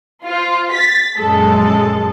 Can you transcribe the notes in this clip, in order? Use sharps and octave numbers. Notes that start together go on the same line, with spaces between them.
F4 C5
A6 B6
A#1 F#2 G#3 A4